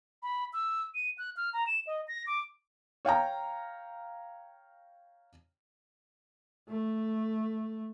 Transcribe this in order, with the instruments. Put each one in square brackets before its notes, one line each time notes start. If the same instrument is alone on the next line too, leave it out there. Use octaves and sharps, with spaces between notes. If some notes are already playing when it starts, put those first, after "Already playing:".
[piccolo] B5
E6
D#7
F#6
F6
A#5
E7
D#5
A#6
D6
[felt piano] C#5 F5 G5 A#5
[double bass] A3